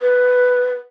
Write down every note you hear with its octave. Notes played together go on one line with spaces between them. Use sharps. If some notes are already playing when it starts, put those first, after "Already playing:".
B4